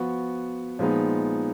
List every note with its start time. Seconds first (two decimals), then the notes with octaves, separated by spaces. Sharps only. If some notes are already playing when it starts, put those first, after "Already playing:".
Already playing: F3 B3 F#4
0.79 A#2 F3 G#3 B3 D#4